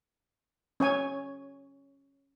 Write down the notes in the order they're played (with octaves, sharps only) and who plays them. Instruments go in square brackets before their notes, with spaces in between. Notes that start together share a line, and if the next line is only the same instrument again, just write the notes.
[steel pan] C#4 C#5 G#5